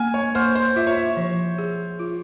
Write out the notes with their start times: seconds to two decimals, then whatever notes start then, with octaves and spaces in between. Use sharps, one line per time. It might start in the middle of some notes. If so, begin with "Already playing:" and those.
Already playing: A#3 G#5
0.14 C#5
0.35 A#3 C5
0.55 C5
0.76 F4 E5
0.87 C#5
0.97 E5
1.17 F3
1.58 G#4
1.99 F4